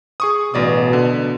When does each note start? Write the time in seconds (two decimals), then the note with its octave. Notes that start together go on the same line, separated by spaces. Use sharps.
0.20 G#4 C#6 D#6
0.54 A1 B2 D5 D#6
0.93 D3